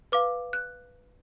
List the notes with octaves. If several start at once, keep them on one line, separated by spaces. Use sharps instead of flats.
B4 F5 D6
F#6